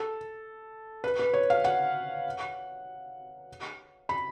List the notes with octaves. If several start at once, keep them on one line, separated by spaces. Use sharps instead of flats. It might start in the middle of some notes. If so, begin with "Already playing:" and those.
Already playing: A4
B4
B4
C#5
F5
F#5
B5